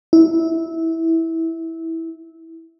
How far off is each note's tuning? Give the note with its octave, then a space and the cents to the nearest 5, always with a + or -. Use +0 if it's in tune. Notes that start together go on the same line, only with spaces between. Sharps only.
E4 -15